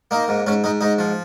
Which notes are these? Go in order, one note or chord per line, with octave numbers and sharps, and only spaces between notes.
A#3 D#4
G#2
G#2 C#4
G#2 D#4
G#2 D#4
F3